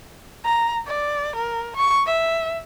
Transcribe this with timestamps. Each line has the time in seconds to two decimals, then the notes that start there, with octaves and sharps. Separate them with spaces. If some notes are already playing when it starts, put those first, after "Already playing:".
0.45 A#5
0.87 D5
1.36 A#4
1.77 C#6
2.06 E5